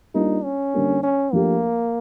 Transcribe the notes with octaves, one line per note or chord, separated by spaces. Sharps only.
G3 A#3 D4 D#4 F4
C#4
D3 G3 A#3 D4
C#4
F3 A3 A#3 D4 G4